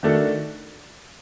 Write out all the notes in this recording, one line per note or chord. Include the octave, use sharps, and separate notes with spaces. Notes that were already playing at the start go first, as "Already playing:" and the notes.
D#3 A3 D4 F#4 A4